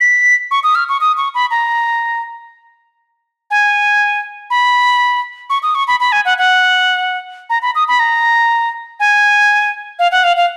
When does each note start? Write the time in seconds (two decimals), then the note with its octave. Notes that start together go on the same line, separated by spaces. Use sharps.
0.01 B6
0.51 C#6
0.64 D#6
0.75 F6
0.89 C#6
1.01 D#6
1.17 C#6
1.34 B5
1.51 A#5
3.51 G#5
4.50 B5
5.50 C#6
5.63 D#6
5.75 C#6
5.87 B5
6.00 B5
6.12 G#5
6.25 F#5
6.38 F#5
7.50 A#5
7.62 B5
7.75 D#6
7.88 B5
7.99 A#5
9.00 G#5
9.99 F5
10.12 F#5
10.24 F5
10.37 F5